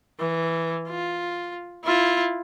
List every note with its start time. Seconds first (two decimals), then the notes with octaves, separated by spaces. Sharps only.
0.19 E3
0.89 F4
1.85 E4 F4